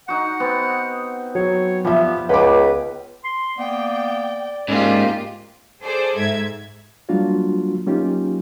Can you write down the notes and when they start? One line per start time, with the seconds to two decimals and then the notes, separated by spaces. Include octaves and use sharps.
0.08 D#4 F#4 F#5
0.40 B3 C4
1.35 F#3 C#5
1.85 F3 G3 B3 E5
2.29 C#2 B4 F#5 D6
3.24 C6
3.57 A#3 B3 D5 G5
4.68 G#2 A#3 C#4 F4 G4 D5
5.82 G#4 A4 C5 D5
6.16 G#2 E5 G#6
7.09 F#3 G3 A#3 D4 F4 F#4
7.87 F#3 A#3 C#4 D#4 F4 G4